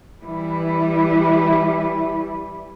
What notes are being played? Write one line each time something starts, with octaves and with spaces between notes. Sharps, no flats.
E3 G3 E4 B4